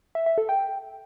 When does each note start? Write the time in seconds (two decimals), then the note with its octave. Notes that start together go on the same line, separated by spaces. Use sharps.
0.15 E5
0.26 E5
0.38 A4
0.49 G5